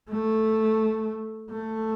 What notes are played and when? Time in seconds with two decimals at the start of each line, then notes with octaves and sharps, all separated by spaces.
0.11 A3
1.52 A3